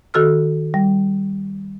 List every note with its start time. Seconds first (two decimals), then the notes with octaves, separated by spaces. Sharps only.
0.14 D#3 F#4 A4 E6 F6
0.74 G3